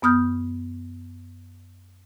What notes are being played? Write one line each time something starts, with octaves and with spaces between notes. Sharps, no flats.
F#2 B3 D#6 F6 G6